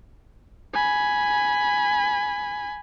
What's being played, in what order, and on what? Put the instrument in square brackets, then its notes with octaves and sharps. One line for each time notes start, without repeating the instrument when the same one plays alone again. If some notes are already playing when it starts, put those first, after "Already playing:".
[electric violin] G#5 B5